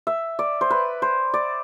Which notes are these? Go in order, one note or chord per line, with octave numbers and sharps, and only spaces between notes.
E5
D5
C5
B4
C5
D5